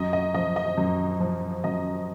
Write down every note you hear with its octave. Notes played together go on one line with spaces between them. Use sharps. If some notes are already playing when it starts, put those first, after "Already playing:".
Already playing: F#2 D#5
D#5
F3 D#5
D#5
F#2
F3
F#2 D#5